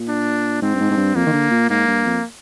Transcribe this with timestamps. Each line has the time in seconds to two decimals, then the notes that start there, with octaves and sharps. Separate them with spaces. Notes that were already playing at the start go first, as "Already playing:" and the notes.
Already playing: A#2
0.08 D4
0.62 G#2 C4
0.75 G2
0.80 G#2
0.91 G#2
0.97 G2
1.15 F2 A#3
1.27 D#3
1.33 D3
1.51 A#2
1.70 G#2 A#3
1.88 G2
2.05 F2